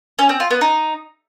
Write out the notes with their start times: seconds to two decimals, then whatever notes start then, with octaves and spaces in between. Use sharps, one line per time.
0.19 C#4
0.29 C4
0.40 F4
0.51 B3
0.61 D#4